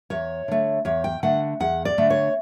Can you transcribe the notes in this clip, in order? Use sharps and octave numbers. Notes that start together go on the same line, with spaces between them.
E2 C#5
D3 A3
E2 C#5
G5
D3 A3 F#5
E2 F#5
D5
D3 A3
C#5